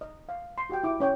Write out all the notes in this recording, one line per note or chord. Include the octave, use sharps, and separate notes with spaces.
D#5
F5
C6
F#4 G4 F#5 G5
E4 D6
C#4 C#5 G5